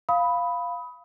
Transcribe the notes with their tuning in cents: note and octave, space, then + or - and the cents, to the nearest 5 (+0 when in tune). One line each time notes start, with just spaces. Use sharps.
F5 +0 B5 +0 D#6 +30